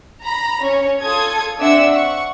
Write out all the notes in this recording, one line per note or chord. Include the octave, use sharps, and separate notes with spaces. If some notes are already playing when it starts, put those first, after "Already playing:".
A#5 B5 A#6
C#4 C#5
F4 A4 D#6 G#6
C4 D4 E5 F#5 E6
F#5 C#6